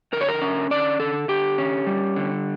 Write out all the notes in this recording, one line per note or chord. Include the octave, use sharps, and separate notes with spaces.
D3 A#4
C#5
A#4
C#4
D3 D5
D3 A4
D3 G4
C#4
G3
D3